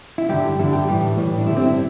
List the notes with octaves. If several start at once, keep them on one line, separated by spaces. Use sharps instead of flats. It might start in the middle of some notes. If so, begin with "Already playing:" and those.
E4
G2 D3 G3 G4
G2 D3 G3 E4
G4
A2 E3 G3
A2 E3 G3
D4
G2 D3 G3 E4
C4
E4